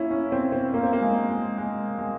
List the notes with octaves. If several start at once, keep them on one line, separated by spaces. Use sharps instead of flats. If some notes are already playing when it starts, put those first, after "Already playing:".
Already playing: A#3 C#4 E4
C#4
C4
C4
A#3
C4
A#3
G#3
G#3
G#3
G#3